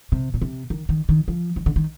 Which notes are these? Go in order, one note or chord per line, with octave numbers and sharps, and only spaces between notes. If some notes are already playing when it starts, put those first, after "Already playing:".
C3
A#2
C3
D#3
D#3
D#3
F3
D#3
D3
D#3